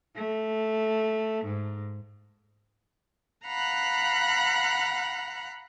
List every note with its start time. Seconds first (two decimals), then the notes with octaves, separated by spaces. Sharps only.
0.15 A3
1.44 G#2
3.46 F5 F#5 A#5 B5 F#6